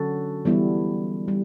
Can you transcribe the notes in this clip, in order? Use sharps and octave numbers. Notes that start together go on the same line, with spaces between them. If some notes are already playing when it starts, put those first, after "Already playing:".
Already playing: D3 F#3 C#4 F#4 A4
E3 G3 B3 E4
G3